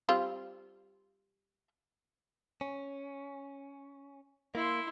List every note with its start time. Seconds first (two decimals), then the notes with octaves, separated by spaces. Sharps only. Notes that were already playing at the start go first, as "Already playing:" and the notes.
0.09 G3 C4 F4
2.61 C#4
4.55 A#3 E4 C6